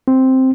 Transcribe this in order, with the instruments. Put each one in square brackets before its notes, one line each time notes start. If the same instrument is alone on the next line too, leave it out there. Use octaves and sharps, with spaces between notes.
[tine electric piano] C4